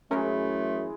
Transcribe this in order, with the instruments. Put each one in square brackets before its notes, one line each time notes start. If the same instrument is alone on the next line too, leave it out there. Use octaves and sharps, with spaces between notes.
[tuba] F#2 [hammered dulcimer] E3 G#3 G#4 [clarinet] A3 [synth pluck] C#4 A#4